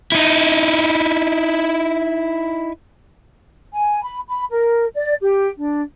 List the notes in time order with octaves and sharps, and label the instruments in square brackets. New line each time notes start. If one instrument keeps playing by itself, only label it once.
[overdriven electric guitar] D#4 E4
[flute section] G#5
B5
B5
A#4
D5
G4
D4